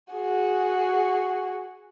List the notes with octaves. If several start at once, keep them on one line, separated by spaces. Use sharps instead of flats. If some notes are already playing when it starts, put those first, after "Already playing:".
F#4 G#4